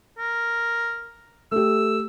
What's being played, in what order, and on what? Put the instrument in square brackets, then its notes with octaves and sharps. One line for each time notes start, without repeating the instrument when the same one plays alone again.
[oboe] A#4
[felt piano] A3 G4 [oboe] E6